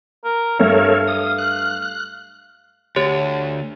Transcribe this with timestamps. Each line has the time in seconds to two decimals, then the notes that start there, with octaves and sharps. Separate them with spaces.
0.24 A#4
0.59 G2 A3 A4 A#4 C#5 F5
1.08 D#6
1.38 F#6
1.82 F#6
2.96 D2 G4 C#5